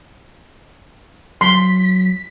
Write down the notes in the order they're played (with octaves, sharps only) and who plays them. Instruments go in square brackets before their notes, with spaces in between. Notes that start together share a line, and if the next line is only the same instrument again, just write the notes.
[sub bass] F#3 [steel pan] C6 [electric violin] B6